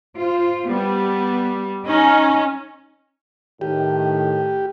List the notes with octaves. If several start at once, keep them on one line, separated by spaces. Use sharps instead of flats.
F4 C5
G3 B3
C#4 D#4
A2 D#3 G4